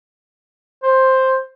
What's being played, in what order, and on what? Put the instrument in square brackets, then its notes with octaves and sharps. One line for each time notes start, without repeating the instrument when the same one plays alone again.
[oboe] C5